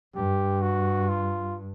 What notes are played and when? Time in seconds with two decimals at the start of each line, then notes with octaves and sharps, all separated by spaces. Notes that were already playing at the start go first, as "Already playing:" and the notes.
0.16 G2 G4
0.62 F#4
1.09 F4